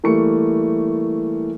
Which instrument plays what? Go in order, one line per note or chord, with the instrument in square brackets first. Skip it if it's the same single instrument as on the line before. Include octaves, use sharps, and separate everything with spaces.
[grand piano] E3 G3 A3 A#3 C#6 C#7